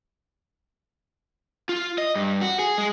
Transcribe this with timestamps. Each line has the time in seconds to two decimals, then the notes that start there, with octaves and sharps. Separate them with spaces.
1.69 F4
1.98 D#5
2.15 G2
2.41 F#4
2.59 G#4
2.78 G#3